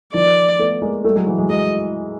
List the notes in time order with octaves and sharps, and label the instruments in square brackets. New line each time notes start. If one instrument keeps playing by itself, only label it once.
[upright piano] D#3 F3 [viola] D5
[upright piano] A3 B3
G#3 A#3
G3 A3
F#3 G#3
E3 F#3
F#3 G#3
[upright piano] F#3 G#3 [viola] D#5